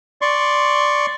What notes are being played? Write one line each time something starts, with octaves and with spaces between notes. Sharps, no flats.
D5 C6 C#6